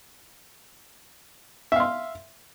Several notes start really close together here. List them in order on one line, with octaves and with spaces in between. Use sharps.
E5 F5 C6